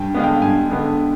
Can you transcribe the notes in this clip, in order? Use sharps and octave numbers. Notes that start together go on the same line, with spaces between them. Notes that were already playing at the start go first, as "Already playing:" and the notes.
Already playing: G2 G5
D3 G#3 B3 F5
G5
G2 G#5
D3 G#3 B3